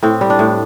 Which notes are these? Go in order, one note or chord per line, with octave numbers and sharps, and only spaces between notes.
A2 C4
G3
D4
A2